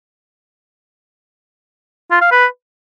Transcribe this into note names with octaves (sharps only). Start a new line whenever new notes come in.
F4
F5
B4